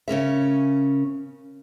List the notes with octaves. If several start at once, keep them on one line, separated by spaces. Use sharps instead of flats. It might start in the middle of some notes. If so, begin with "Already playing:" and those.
C#3 C#4 A#4 E5